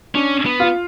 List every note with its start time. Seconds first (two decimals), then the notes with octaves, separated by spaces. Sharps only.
0.15 C#4 D4
0.46 B3
0.60 F4